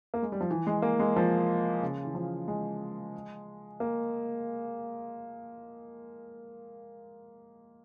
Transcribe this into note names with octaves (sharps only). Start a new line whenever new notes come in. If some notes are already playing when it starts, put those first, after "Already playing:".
A#3
G#3
G3
F3
E3
G#3
A#3
G#3
F3
C#3
E3
F3
G#3
A#3